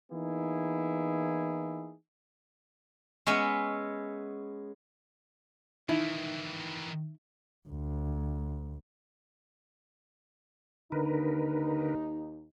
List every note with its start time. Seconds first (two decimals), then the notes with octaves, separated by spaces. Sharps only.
0.12 E3 A#3 B3 D#4 E4 G#4
3.26 G#3 B3 C#4 E5
5.89 D#3 E3 D#4 E4
7.69 D2
10.92 D#2 D3 D#4 A#4 B4